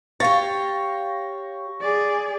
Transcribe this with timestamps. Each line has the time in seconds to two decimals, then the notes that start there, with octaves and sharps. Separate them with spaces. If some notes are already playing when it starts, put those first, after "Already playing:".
0.20 G4 C#5 F5 C#6 A6 A#6
1.81 G#4 D5